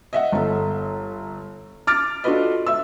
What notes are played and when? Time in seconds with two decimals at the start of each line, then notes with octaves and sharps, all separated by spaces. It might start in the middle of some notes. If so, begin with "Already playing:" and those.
0.13 D#5 E5 F#5
0.32 G1 A4
1.87 D6 F6 A6 D7
2.24 D4 F4 F#4 A4 B4 D#5
2.66 E5 E6